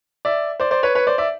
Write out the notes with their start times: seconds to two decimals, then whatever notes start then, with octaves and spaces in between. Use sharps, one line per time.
0.25 D5 E5
0.60 C5 D5
0.71 C5 D5
0.83 B4 C#5
0.95 B4 C#5
1.07 C5 D5
1.18 D5 E5